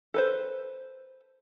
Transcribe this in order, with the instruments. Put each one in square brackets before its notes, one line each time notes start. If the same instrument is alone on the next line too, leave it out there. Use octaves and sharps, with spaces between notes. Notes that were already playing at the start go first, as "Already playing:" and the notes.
[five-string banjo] A4 B4 C5